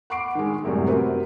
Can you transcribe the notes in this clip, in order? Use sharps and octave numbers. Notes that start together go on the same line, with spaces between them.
F#5 B5 C#6 D6 C7 D7
D#3 G#3
F#2 A2 C3 F#3 G3
C4 F#4 A#4 B4